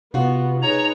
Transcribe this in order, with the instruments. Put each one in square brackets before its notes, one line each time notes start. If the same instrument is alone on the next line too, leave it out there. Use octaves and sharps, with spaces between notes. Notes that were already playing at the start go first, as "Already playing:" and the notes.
[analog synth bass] C3 [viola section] B3 [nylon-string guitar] F4 F#4
[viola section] D#4 G#4 B4 [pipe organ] C#5 A#5